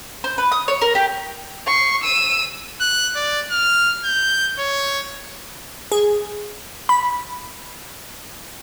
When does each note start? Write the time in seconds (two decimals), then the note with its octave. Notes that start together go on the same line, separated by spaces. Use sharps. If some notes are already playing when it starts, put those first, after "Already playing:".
0.24 C5
0.38 B4
0.52 D#6
0.68 C#5
0.81 A#4
0.95 G4
1.67 C#6 C7
2.04 E6 D#7
2.81 F#6
3.16 D5
3.51 F6
4.05 G6
4.59 C#5
5.92 G#4
6.89 B5